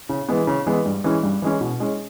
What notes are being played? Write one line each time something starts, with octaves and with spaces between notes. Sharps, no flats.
C#3
E3 G#3 B3
C#3
E3 G#3 B3
G2
E3 G#3 C#4
G2
E3 G#3 C#4
B2
G#3 C#4